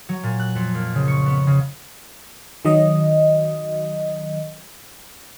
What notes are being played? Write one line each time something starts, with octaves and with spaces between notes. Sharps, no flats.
F#3
A#2
F#6
F2
A#3
C#3
C#6
B3
C#3
D#3 F#3 D#5